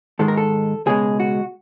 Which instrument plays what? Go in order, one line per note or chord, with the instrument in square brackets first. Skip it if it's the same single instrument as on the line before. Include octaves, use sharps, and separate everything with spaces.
[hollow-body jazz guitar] G#2 D#3 G#3 A4
A#4
A4
C#2 B2 G#3 G#4
F#4